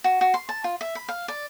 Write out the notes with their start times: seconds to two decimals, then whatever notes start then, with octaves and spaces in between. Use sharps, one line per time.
0.04 F#4
0.21 F#4
0.34 C6
0.49 A5
0.64 F4
0.81 E5
0.95 B5
1.09 F5
1.28 D5